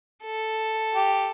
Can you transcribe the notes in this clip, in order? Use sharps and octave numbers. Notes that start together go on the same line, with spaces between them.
A4
G4